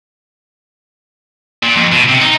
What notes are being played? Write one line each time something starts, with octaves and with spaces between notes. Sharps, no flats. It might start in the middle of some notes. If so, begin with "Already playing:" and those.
A#2
F2
B2
C3
D#4